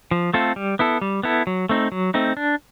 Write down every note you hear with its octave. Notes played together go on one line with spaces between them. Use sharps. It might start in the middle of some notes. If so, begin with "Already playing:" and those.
F3
A3 C4 F4 A4
G3
B3 E4 A4
G3
B3 E4 A4
F#3
A3 C4 D#4
F#3
A3 C4 D#4
D4